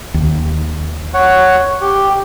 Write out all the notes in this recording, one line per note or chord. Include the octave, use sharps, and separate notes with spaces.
D#2
C#5 F#5
G4